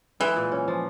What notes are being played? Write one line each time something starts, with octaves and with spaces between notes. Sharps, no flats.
E3 G#3
A#2
C#4
F3